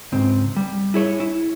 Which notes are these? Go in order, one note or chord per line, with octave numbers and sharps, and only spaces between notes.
C#2 G#2 C4
G3
E4 G#4 C#5
E4